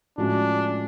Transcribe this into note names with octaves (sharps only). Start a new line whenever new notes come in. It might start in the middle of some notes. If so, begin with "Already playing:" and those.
A2 F3 G#3 C#4 D4 F#4